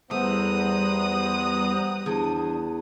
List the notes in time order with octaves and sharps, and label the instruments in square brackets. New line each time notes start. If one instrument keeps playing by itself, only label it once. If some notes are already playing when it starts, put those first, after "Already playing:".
[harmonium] E2 B3 C5 [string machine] G3 A#5 F#6 [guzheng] A3 [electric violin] D#6
[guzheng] E2 [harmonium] D4